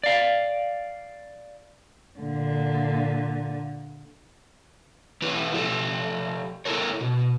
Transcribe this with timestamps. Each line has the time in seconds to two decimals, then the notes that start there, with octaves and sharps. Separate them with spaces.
0.04 D5 F5
2.19 A#2 D3
5.22 E3 E4 G4 B4
5.53 F3 G4 A4
6.65 E4 A4 A#4 C#5
7.01 B2